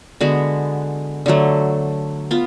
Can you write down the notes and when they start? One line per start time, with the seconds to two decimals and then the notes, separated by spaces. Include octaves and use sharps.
0.21 D3 G#3 B3 F#4
1.26 D3 F#3 A3
2.31 B3 F4